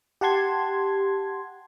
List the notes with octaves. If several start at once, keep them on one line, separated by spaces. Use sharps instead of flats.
G4 F#5 A5 C6 G#6